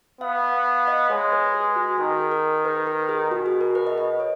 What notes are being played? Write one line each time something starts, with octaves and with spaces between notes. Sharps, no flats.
B3 F5
F5
F5
D#5
G#3 C#5
B4
G#4
F#4
D#3 G#4
A#4
G#4
A#4
A#4
B4
A#4
G#4
B2 F#4
G#4
A#4
B4
D#5
D#5
C#5